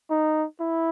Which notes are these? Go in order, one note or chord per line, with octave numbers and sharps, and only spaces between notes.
D#4
E4